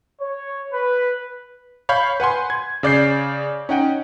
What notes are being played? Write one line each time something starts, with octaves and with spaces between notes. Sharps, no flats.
C#5
B4
C#5 F5 B5 C#6 G6
B4 F#5 G#5 C6
G#6
C#3 D5 G6 C7
C#4 D#4 F#5 G5